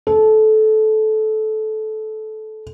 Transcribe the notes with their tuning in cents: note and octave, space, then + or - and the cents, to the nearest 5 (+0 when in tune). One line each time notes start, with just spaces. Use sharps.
A4 -20